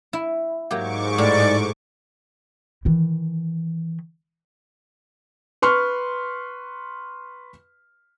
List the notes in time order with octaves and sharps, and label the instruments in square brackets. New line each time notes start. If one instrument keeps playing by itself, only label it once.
[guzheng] E4
[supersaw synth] G#2 C#6 D6 [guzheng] F#3 A#3 G4
[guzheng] A2 [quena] D5
[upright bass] D#3 E3
[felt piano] B4 C6 C#6 F6